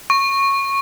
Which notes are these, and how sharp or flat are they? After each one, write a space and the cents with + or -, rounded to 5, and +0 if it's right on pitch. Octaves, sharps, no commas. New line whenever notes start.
C#6 -10